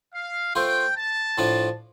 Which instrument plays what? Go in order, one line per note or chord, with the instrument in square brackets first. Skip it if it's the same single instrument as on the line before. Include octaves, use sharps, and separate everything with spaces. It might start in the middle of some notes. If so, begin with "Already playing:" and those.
[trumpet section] F5
[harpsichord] A3 F4 C5 [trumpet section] G5
[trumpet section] A5
[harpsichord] A2 F3 D4